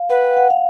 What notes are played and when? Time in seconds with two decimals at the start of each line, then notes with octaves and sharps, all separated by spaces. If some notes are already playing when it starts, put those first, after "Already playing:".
Already playing: F5
0.09 B4 F#5
0.23 G5
0.37 F#5
0.50 F5